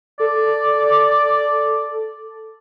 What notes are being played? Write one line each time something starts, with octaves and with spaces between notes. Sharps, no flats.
A4 D5